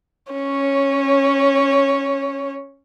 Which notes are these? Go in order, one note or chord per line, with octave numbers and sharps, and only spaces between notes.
C#4 C#5